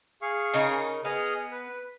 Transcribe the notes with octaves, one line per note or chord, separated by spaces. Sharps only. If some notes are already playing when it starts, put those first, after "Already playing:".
G#4 F5 C#6
C#3 D#4 A#4
B3 G#4 D#5 F6
B4